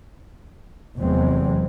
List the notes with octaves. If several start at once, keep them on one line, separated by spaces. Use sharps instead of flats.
F1 E2 F#3 G#3 C4